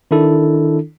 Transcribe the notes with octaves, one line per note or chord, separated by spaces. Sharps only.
D#3 D4 E4 A4